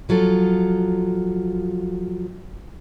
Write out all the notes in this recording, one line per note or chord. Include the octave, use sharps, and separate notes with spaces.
F3 F#3 F4 A4